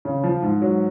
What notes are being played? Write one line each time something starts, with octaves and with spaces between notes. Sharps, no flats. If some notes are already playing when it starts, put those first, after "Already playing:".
C#3
F3
G#2
F#3